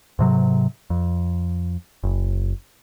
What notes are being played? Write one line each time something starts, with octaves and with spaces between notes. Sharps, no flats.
G#2 C3 F#3
F2
F#1